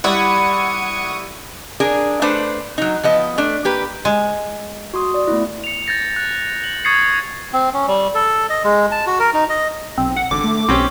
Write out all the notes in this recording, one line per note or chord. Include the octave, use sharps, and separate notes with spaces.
G3 E4 D5 F#5 B5 C#6 D#6 G#6
D4 G#4 A#4
A3 D4 B4 C5 D5
F#3 D#4
F3 B3 D#5
A3 D4
A#3 G4 B4
G#3
F#4 C6 D#6
D5
A3 B3 E4
C#7 F7
G6 A6 A#6 C#7
F#6
F#7
C#6 D#6 G#6 A6 C7 C#7
C4
C#4
G3
A4
D#5
G#3
A5
F#4
A#4
D#4
D#5
B1 C4
F#5
G#1 D3 D6
A3
B1 C4 C#4 G4